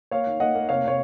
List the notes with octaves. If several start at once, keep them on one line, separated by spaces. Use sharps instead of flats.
A#3 C#5 F5
D#3
A#3 D#5 F#5
A#3
C3 C#5 F5
C3 C#5